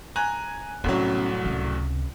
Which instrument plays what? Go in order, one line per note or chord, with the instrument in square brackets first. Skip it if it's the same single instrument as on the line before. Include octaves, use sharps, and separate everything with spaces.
[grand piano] G#5 A#5 F#6
[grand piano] C2 A2 F#3 [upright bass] B3 C#4
[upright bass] C#2 C3